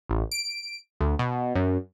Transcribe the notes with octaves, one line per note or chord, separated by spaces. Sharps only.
A1
D7
D2
B2
F#2